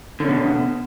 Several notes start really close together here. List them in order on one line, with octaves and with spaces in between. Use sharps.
D3 C#4 B2